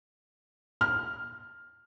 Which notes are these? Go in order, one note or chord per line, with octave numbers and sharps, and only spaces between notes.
F6